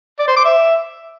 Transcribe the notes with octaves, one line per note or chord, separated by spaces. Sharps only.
D5
C5
D6
E5